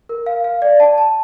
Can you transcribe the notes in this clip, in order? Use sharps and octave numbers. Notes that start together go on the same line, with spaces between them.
A#4
F5
F5
D5
A5
A5